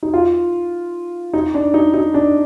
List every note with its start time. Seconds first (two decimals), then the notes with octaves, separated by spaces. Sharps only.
0.03 D#4
0.14 F4
1.33 D#4
1.54 D4
1.74 D#4
1.94 D#4
2.14 D4